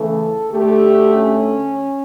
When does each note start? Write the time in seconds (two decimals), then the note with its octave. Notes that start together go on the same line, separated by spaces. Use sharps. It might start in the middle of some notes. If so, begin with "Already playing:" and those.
Already playing: C#3 E3 A3 A4
0.50 D2 D3 A3 G4
1.14 C#4